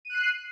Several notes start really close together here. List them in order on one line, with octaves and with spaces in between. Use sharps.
D#7 F#6 C7